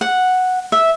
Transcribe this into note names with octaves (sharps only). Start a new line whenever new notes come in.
F#5
E5